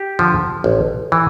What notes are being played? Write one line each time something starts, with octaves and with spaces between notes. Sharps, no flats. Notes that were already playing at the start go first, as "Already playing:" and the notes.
Already playing: G4
D3 F3
A1
E3